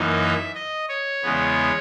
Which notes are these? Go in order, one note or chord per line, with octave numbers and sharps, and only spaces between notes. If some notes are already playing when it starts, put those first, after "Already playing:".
Already playing: F#2 E3 A#3 D#4
E5
D#5
C#5
E2 C#3 G#3 B3